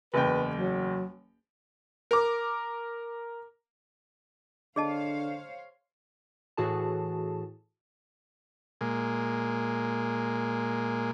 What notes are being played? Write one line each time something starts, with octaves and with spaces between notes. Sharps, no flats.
F#1 E2 B4 G5
F#3
A#4 D6
D3 G#4 C5 C#5 D#5 F5 A5
A2 E3 F#4 G#4 A4 A5
A#2 G#3